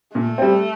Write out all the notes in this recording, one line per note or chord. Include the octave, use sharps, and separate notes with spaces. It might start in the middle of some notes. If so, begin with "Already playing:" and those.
A#2 A3
G3 C4